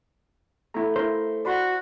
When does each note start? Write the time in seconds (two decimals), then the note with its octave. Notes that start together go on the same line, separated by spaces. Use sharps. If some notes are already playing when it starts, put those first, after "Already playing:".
0.74 A3 E4 A#5
0.96 E4 A#4 C5
1.45 F#4 D5 B5 C6